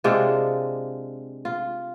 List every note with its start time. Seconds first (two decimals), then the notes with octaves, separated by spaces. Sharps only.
0.04 C3 G#3 D4 F4
1.45 F4